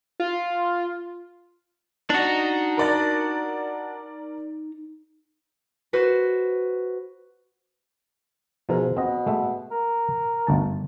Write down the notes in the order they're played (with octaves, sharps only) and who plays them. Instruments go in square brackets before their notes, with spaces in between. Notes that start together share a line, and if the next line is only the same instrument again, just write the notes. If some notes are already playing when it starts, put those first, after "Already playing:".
[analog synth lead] F4
[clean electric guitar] D4 F#4 [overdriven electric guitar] D#4 D#5
[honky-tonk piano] A#4 D5 A6
[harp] F#4 B4 C5
[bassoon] G#2 [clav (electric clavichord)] B2 F3 A#4
[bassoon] B2 [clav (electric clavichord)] C4 D#5
[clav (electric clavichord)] G#3 A3 E5
[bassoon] A#4
[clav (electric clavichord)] G1 D2 A5